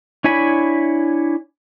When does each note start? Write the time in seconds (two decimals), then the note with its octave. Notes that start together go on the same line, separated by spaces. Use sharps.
0.24 D4 E4 C#5 G#5 B5